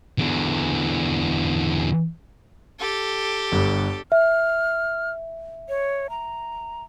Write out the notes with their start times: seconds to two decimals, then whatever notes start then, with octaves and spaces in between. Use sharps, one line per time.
0.18 E2 D3
2.79 G4 A4
3.52 G1 G2
4.12 E5 F6
5.69 C#5
6.10 A#5